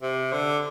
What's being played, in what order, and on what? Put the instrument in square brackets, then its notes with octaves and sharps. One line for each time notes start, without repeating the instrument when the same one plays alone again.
[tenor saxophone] C3
D3